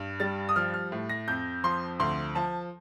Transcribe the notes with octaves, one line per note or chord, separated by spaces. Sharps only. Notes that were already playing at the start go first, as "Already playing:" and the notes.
Already playing: G2
G3 A6
D#6
F3 F6
F6
A2
A#6
F2 G6
F3 C6
D2 C6
F3 A5